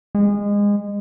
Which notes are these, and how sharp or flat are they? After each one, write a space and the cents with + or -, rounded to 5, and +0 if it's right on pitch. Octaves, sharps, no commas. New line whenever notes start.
G#3 -25